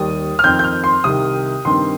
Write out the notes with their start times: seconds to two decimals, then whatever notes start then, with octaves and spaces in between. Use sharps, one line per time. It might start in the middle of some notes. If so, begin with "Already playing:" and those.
Already playing: D#2 D#3 G3 D#6
0.39 F6
0.44 F2 D#3 C4 G6
0.59 G6
0.64 F6
0.84 C6
1.04 C2 C3 D#3 D#6
1.65 G2 D#3 C4 C6